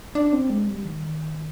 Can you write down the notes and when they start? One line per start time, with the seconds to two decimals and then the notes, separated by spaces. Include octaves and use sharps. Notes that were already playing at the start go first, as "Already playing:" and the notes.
0.15 D4
0.33 C4
0.50 G#3
0.68 G3
0.85 D#3